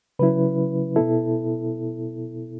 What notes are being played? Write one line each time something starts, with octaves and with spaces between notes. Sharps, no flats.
C#3 F#3 C#4 E4 B4
B2 B3 E4 A4